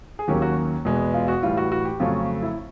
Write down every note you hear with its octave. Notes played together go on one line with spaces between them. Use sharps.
G#4
D#2 D#3 F#3 A#3 C#4 G4
F#4
E2 B2 G#3 B3
F4
F#4
A2 E3 G3 F4
F#4
F#4
G4
F2 C#3 F#3 A3 C#4 F4
E4